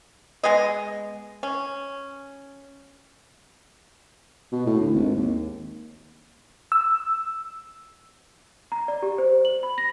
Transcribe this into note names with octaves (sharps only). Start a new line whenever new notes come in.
G#3 B3 G#4 D#5
C#4
B2
A2
D2
G#1
D#2
E6
A#5
D5
G4
C5
F#7
B5
A#6